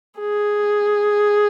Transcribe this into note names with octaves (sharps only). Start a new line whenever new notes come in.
G#4